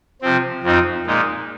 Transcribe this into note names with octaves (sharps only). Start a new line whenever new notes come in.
C3 F3 C4
F2 F3 C4 D#4
A#2 G#3 D#4